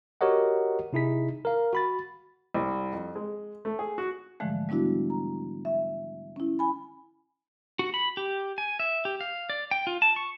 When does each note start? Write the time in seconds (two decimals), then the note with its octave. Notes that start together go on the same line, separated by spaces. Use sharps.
0.21 F#4 G4 A#4 C#5 D#5 F#5
0.93 C3 D#4 E4 G#4 B6
1.45 A#4 F5
1.73 F#4 B5 A6
2.54 C2
2.92 F2
3.16 G#3
3.65 A3
3.79 G#4
3.98 F#4
4.40 G#2 D3 E3 F3 G#3 A3
4.69 G3 B3 D4 E4 F#4
5.10 A#5
5.65 E5
6.36 C#4 E4
6.59 G#5 B5
7.79 F#4
7.94 B5
8.17 G4
8.58 G#5
8.80 E5
9.05 G4
9.21 F5
9.50 D5
9.71 G5
9.87 F4
10.02 A5
10.16 C#6